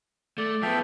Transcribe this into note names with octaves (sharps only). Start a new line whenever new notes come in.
A3 D5
F3 B3 A4 E5 G5